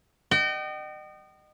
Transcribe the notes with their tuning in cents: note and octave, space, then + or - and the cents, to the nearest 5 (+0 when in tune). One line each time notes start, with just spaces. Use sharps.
D#5 -30 G5 -40